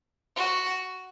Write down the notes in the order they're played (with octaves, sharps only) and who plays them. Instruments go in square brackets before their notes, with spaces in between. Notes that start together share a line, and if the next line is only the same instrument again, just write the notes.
[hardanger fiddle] F#4